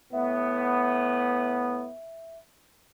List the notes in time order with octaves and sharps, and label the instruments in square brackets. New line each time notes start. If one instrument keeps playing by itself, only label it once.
[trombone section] A2 B3 [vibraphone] E5